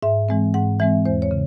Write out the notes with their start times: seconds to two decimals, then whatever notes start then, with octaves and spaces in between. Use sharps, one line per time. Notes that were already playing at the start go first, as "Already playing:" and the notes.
0.03 G#2 E5
0.29 E3 G#3 C4
0.54 G#2 F#5
0.80 E3 G#3 C4 E5
1.06 E2 C5
1.22 C#5
1.31 C#3